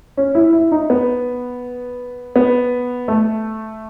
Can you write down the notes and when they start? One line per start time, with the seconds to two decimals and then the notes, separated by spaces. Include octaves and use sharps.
0.17 C#4
0.35 E4
0.53 E4
0.72 D#4
0.90 B3
2.36 B3
3.08 A3